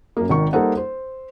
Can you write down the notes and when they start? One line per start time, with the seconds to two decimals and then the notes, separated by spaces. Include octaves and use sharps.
0.17 F#2 A#3
0.29 G#1 D#3 C#6
0.53 G3 A#3 D#4 A4 C5 F#5
0.77 C5